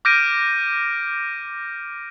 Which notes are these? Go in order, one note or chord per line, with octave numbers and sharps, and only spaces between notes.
D6 F6 G6 A#6 D7 D#7